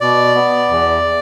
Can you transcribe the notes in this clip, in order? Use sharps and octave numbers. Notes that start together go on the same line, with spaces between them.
B2 D5
B3
E2